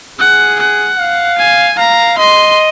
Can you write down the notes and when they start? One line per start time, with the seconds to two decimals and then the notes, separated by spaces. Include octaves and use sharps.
0.19 G#4 F#5
0.60 F#5
0.99 F5
1.38 G#5
1.78 F5 A#5
2.18 D#5 C6